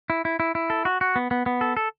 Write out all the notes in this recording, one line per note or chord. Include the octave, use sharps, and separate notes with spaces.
E4
E4
E4
E4
A4
F#4
F#4
B3
B3
B3
A4
A4